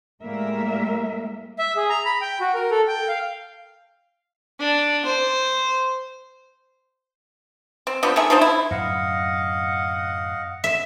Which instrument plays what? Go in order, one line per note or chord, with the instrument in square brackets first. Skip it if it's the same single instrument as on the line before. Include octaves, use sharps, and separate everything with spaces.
[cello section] A2 G3 G#3 A#3 A#4 E5
[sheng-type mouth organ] E5
G#4
A#5
B5
G5
F#4
A#4
A4
G5
F5
[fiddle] D4
C5
[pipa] C4
F3 B3 D4 G4
D#3 A3 G#4 E5
F3 D4 D#4 C5
E4
[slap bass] F#2 A2 D3 [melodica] D#5 F5 F#5
[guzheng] E5